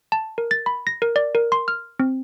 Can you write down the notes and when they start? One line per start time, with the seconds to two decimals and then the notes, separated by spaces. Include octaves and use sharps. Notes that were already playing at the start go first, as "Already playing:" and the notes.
0.12 A5
0.38 A#4
0.51 A6
0.66 B5
0.87 A#6
1.02 A#4
1.16 D5
1.35 A#4
1.52 C6
1.68 F6
1.99 C4